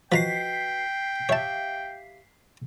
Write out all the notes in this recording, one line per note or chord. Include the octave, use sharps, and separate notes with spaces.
F3 F#4 B4 D#5 G5 A#5 B6 C7
G4 C#5 E5 F5 A5